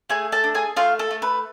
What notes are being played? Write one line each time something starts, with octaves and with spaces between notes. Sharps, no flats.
A3 G#4 G#5
A4 A5
D4
G#4 G#5
A3 F4 F5
A4
A3
B4